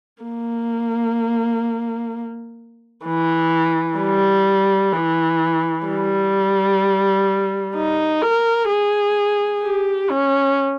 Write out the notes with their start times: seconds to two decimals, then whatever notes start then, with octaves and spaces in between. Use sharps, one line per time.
0.23 A#3
3.05 E3
3.99 G3
4.93 E3
5.87 G3
7.76 D#4
8.22 A#4
8.69 G#4
9.63 G4
10.10 C#4